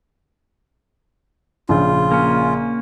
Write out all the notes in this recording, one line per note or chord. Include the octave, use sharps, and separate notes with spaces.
A#1 C#3 F4
A#3 C#4